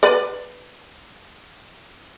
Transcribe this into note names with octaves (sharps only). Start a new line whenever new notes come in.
B4 D5